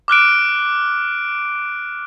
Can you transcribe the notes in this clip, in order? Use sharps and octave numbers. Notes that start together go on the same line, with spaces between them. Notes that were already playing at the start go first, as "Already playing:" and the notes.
D6 F6 F#6 D7